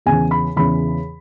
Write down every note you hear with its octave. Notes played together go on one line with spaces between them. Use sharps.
E2 C#3 E3 G#5
B5
E2 C#3 E3 B5